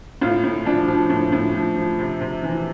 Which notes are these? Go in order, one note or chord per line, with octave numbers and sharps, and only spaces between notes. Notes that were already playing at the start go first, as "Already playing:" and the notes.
A2 F4
A2
F3 D4
F3
A2
A2
F3
F3
C3
C3
E3